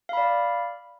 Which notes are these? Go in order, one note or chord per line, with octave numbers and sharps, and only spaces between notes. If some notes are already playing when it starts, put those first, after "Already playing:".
D5 F5 B5